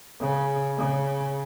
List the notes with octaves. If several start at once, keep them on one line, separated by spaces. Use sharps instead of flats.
C#3
C#3